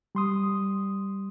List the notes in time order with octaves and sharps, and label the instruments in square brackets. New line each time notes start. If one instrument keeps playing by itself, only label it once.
[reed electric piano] G3 C6 D#6